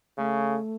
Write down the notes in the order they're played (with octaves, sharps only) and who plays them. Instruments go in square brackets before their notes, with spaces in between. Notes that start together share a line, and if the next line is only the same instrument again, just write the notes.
[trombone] C#3 [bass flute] A3